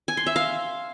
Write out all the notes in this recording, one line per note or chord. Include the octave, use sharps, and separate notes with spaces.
G#5
C6
E5
F5